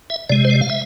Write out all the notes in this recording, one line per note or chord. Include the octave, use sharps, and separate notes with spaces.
E5
C3 G#3 D5
C5
D5
F5
E5